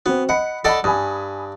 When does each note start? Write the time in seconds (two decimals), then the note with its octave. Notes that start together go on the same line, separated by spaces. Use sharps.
0.06 B3 C4 F#4
0.29 D#5 F#5 B5 C#7
0.65 A4 D5 D#5 F#5 B5
0.84 G2 G#5 B5 D#6